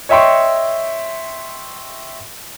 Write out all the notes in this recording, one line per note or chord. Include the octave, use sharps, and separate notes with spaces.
C#5 D#5 E5 G5 C6 C#6